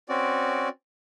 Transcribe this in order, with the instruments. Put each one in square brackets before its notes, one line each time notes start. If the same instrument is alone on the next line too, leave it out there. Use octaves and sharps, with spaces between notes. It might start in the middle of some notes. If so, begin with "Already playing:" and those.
[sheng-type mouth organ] C4 C#4 F#4 D5